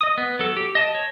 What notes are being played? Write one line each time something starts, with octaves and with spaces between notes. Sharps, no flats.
D#5 D#6
B3
F#3 A4
G4
D#5 A5
C#5